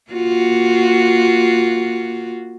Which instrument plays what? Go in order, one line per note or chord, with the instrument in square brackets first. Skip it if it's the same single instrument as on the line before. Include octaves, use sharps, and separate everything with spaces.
[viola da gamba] A#3 F4 F#4